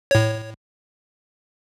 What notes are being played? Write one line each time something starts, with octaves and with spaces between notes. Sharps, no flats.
A2 C#5